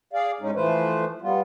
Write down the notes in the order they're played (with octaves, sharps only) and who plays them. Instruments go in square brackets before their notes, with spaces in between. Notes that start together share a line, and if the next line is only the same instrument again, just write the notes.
[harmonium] G#4 D5 F5
A2 G#3 C#4 D#4
E3 F3 A3 B4 C5
G3 B3 F4